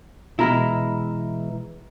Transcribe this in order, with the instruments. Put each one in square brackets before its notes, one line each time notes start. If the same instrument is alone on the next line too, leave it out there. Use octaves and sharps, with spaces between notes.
[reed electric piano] B2 A#5 F6 [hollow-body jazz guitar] E3 G#3 E4